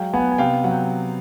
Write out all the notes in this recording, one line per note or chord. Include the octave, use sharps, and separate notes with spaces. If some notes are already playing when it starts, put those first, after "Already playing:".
Already playing: F#3 G#3 F5 G5
B3 F#5 G#5
G#5
C3 F5 G5
F#3 F#5
G5